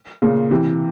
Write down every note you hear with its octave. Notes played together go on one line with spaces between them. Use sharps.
A#2 C#3
C3 E3